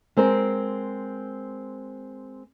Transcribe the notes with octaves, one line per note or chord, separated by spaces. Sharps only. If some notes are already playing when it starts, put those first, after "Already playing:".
G#3 C4 A#4 C5